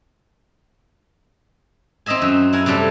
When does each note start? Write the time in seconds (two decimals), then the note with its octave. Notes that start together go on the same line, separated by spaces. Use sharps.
2.06 C4 D#4 D#5 E5 G#5
2.22 F#2
2.53 E4 A#4 F#5 G#5
2.66 C3 F#3 G3 A3